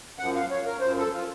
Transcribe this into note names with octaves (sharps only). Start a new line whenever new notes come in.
F#2 F3 F#5
F5
C#5
A#4
F#2 F3 C5
A4
F4